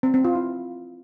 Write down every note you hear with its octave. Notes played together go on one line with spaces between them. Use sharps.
C4
C4
F4
E4